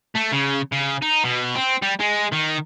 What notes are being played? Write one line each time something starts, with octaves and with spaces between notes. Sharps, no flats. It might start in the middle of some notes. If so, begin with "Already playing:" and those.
A3
C#3
C#3
D#4
B2
C4
G3
G#3
D#3